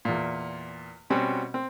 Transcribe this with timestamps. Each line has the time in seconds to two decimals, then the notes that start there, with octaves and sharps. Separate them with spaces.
0.05 E2 A#2
1.10 B2 G3 C4 C#4 F#4
1.54 C4